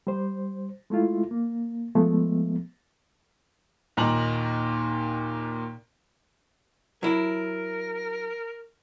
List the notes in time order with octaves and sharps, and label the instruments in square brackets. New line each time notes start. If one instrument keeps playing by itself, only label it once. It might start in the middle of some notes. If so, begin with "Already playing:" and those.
[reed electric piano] G3 C5
G#3 A3 E4 F4
A#3
F3 G#3 A3 B3
[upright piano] D#2 A#2 D#4 A#5 F#7
[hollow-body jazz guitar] F#3 E4 [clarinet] A#4